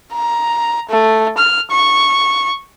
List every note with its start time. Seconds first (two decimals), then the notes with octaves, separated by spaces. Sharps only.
0.13 A#5
0.89 A3
1.38 F6
1.72 C#6